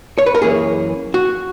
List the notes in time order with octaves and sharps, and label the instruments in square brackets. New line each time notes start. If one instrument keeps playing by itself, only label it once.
[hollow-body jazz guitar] C#5
B4
A#4
F#2 E3 A#3 C#4 G#4
F#4